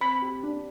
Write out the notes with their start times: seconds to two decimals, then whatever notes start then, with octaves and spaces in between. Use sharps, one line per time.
0.01 C4 B5
0.22 G4
0.43 D4